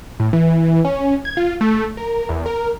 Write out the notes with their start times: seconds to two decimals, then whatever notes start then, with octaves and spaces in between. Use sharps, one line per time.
0.20 A2
0.33 E3
0.85 C#4
1.25 G#6
1.37 F4
1.61 A3
1.97 A#4
2.29 E2
2.46 A#4